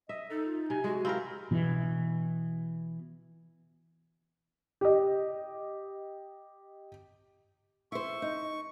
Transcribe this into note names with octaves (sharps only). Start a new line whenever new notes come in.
D#5 E5
D#4 A4
F4
C3 G#5
G#3 F#4
C4 E4 A#4 F5
B2 E3
G4 D#5
E4 C5 C#6
D#4